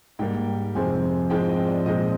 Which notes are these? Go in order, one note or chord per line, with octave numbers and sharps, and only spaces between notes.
G#2 G3 A#3 G5
F2 C3 F3 G#3 C4 G#5
G#2 F3 G#3 C4 G5
D#5
D5
A#2 F3 G#3 C4 D#5